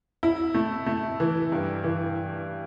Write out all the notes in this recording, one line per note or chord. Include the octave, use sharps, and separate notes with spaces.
E4
A3
A3
E3
G2
E3